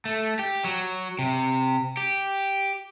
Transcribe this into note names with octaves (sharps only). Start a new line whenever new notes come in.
A3
G4
F#3
C3
G4